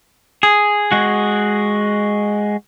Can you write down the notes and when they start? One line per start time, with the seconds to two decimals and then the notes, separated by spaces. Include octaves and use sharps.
0.43 G#4
0.92 G#3 F#4